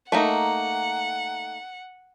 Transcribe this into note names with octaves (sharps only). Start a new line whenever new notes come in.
A3 A#3 D#4 F#5